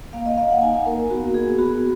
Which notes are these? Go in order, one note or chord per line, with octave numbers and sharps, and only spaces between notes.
A#3 F5
D#5
A#3 F5
F#5
D#4 G#5
A#3 A#4
B3 F#4
F#4 G#4
B3 F#4